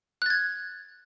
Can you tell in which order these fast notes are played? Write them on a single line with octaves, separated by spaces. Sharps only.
F#6 A6 G#6